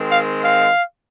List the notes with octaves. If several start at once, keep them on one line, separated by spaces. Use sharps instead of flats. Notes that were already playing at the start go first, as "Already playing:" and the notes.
Already playing: D#3 G#3 C4
F5
F5